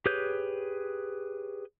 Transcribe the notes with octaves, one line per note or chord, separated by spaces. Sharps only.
G4 G#4 B4 C#5 G6